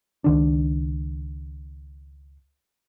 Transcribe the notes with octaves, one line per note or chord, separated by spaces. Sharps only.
C#2 D#3 D4